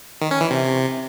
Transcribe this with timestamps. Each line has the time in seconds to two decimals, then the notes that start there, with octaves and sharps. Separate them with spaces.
0.21 D#3
0.31 C#4
0.41 E3
0.51 C3